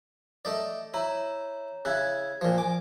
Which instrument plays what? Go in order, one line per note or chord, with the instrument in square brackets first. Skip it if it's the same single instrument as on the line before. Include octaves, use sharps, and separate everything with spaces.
[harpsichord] A3 D#4 D5
[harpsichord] E4 [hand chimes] C#5 A#5
[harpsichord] C#3 E4 [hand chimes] F#6 G#6
[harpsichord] A#2 F3
[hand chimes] G#5 [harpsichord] D6